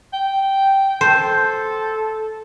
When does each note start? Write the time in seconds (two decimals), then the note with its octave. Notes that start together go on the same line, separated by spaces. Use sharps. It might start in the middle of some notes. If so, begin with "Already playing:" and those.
0.13 G5
1.01 A4 C5